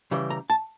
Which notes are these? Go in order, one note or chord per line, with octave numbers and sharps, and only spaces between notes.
C#3 E3 G3
A#5
A5